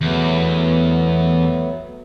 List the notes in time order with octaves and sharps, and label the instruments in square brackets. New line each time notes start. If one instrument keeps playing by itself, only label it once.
[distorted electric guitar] E2 [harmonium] F#3 A3 B3